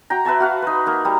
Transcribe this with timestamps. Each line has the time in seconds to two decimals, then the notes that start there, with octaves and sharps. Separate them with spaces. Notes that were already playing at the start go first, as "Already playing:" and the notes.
0.10 F#4 G5 A#5
0.25 B4 E5 A5 C#6
0.40 F#4 F5 F#5
0.62 D#4 B4
0.86 A#3 D#4
1.05 G3 A#5